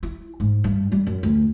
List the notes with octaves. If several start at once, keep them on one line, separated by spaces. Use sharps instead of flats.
E4
G#2
G2
G3
F#2
D2